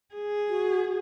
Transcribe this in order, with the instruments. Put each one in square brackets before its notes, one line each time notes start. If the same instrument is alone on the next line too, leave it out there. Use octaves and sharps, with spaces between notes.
[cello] G#4
[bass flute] F#4